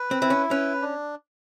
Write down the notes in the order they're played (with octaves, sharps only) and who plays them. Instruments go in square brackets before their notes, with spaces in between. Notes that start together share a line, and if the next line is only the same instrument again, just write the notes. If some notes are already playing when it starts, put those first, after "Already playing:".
Already playing: [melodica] B4
[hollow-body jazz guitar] C4
[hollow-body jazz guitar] C4 [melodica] E4
[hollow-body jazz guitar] C#4
[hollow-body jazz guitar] C#4 [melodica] B4
[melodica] D4